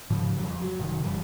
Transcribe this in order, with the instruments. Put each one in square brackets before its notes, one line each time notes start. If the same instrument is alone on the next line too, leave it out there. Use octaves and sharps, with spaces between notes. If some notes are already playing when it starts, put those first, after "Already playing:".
[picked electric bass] G#2 C#3 F3
F2 F#3 G3
F2
F#3
F#1 C3 D#3
F1 F#2 E3 G3